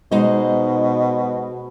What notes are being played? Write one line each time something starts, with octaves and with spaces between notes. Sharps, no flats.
B2 G#3 D#4 C5